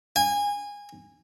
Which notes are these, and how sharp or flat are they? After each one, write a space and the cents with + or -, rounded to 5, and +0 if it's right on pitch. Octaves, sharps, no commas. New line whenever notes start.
G#5 -25